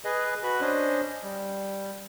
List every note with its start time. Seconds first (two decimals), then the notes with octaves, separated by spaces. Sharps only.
0.05 G#4 B4 D#5
0.43 F#4 B4 B5
0.61 C#4 D4 C5 D#5
1.23 G3